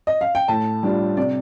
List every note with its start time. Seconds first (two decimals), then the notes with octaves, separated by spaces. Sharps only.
0.07 D#5
0.21 F5
0.35 G5
0.48 A2 A5
0.83 G3 D4 F4
1.17 C3 D5